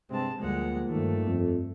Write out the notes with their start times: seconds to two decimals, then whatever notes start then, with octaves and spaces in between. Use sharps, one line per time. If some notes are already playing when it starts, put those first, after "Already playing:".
0.11 G2 C3 G#3 C4 A5
0.40 D2 F3 G3 G#3 A#3 F#5
0.89 G2 D#3 A3
1.27 F2